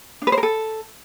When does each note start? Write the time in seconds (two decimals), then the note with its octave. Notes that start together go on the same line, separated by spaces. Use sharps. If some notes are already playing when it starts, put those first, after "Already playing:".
0.22 D4
0.27 B4
0.32 C5
0.38 A#4
0.43 A4